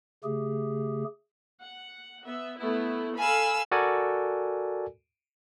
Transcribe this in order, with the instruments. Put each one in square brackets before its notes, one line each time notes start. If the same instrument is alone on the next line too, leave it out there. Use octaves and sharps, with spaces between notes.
[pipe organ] C#3 A3 G4 G#4
[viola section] F#5
B3 E5
A3 B3 E4
[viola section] A4 F5 B5 [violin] G#5 E6
[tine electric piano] F#4 A4 A#4 D5 G#5